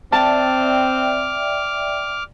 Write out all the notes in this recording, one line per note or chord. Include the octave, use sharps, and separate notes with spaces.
C4 D5 E5 G5 A5 D6 F6